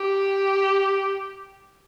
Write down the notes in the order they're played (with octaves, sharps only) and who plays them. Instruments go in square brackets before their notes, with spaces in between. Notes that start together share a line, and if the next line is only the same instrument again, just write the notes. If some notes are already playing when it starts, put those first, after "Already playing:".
Already playing: [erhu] G4